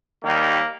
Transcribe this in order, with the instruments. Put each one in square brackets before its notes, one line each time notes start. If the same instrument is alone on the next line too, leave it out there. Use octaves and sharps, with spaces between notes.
[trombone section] D#2 D#3 G3 A#3